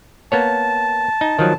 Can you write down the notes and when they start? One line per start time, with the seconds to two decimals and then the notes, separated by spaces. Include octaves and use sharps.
0.32 A#3 B3 C#5 A5
1.21 D#4
1.39 D#3 F3 F#3